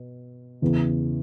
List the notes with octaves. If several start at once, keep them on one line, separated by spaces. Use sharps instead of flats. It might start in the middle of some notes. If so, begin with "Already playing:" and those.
Already playing: B2
E2 C#3 E3